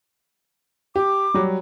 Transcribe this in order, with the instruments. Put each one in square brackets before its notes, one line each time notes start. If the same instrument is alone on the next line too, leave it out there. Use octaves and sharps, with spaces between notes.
[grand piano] G4 [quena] D6
[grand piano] F#3 G3